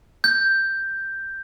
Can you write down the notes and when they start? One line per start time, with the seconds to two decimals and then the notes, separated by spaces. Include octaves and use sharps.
0.24 G6